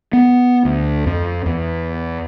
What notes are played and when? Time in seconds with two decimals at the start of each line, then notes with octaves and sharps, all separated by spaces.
0.13 B3
0.65 D2
1.06 F2
1.46 E2